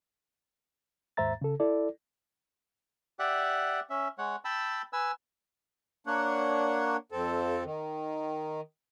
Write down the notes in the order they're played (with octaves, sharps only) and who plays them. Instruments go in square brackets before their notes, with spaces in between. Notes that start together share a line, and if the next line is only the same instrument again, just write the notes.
[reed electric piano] D#2 G#2 C5 E5 A#5 A6
C#3 A4
E4 A4 D5
[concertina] G4 D5 E5 F#5
C#4 E5
G#3 C#5 F#5
G5 A5 B5 E6
B4 G#5 E6
[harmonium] A#3 D4 C#5 F#5
F2 C4 A4
D#3